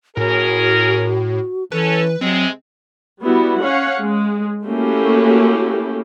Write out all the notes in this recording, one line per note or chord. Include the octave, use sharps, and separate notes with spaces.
A2 C#4 F#4 G#4 A#4
E3 C#4 A4 B4
C3 F#3 G#3 C4
G3 B3 E4 F#4
C#4 C#5 F5 F#5
G#3
A3 A#3 C#4 E4 F#4 G4